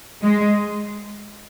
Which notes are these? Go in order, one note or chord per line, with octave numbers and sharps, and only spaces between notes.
G#3